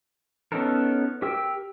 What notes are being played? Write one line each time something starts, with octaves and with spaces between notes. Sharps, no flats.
B3 C#4 D#4 A4 A#4
G4 A#4 G5 E6